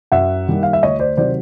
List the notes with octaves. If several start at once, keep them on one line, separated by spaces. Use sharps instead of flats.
F#2 E5 F#5
D#3 G3 A#3
F5
E5
D2 C#5 D#5
C5 D5
C3 D#3 F#3 C5 D5